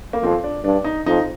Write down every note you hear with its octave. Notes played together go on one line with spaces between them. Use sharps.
A#3
F2 C4
D4
G2 D4
D#4
F2 D#4